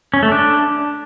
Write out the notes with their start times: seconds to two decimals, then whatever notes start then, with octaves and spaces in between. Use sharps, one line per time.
0.14 C#4
0.23 A3
0.32 D4